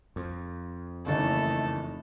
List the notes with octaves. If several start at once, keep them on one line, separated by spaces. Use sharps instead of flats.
F2
F#1 D#2 E3 A3 D#4 A4